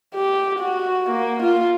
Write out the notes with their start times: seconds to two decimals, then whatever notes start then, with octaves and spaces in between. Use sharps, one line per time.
0.15 G4
0.59 F#4
1.10 A#3
1.43 F4